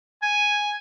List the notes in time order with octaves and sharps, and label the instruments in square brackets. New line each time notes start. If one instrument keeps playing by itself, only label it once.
[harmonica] G#5